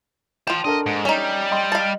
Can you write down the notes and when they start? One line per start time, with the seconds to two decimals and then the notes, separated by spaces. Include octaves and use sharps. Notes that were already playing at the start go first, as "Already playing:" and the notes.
0.47 F4 G5 A5 C6
0.65 D4 A4 A#4 D#5
0.86 G#2
1.05 G3 C#4 D#4
1.51 D#5 G5 C6
1.72 F5 A5